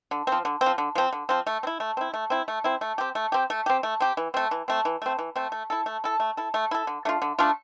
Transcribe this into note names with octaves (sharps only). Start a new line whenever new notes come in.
D3
F3 C4
D3
C4
F3
D3
F3 C4
D3
F3 C4
A3
C4
E4
A3
C4 E4
A3
C4 E4
A3
C4 E4
A3
C4 G4
A3
C4 G4
A3
C4 G4
A3
C4 G4
E3
A3 C4
E3
A3 C4
E3
A3 C4
E3
A3 C4
A3
E4 A4
A3
E4 A4
A3
E4 A4
A3
E4 A4
D3
A3 D4 F4
D3
A3 D4 F4